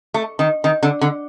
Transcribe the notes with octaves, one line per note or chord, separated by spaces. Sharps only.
A3
D#3
D#3
D3
D3